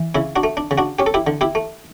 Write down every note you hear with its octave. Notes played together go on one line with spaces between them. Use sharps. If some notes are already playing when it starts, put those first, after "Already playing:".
Already playing: E3
C#3 E4
D4 F#4
A3
D4
C#3
D4 F#4
C#4 G4
A4
E4 G4
D3
E4 G4
A3